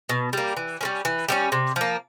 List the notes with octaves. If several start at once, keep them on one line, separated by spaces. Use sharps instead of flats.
B2
G3 A#3
E3
G3 A#3 C#4
E3
G3 A#3 C#4
C3
F3 A#3